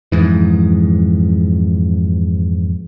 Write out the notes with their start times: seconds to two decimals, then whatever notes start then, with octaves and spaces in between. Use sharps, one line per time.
0.12 F2 G#2 E3